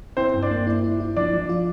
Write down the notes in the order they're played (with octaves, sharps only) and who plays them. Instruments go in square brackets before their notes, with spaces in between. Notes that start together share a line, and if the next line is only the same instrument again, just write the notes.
[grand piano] C4 C5 [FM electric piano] E4
[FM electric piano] G2
[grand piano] D4 D5
[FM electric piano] A#3
E4
E4
E4
[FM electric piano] F3 [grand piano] D4 D5
[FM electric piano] F3
F4